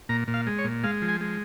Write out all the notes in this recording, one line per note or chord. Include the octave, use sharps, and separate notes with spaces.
A#2 A#5
A#2
F5
G#3
C#5
A#2
G#3 F5
F3
G#5
G#3